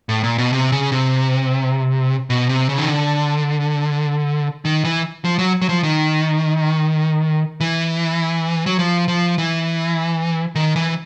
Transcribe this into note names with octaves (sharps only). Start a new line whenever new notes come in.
A2
A#2
B2
C3
C#3
C3
B2
C3
C#3
D#3
D3
D#3
E3
F3
F#3
F#3
F3
D#3
E3
F#3
F3
F3
E3
D#3
E3